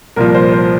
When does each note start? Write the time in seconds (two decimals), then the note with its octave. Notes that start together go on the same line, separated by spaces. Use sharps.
0.16 C2 A#2 F3 A#4
0.35 C5
0.52 C5